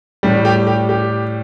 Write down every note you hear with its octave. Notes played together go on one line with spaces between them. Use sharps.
A2 G3
G4
G4
G4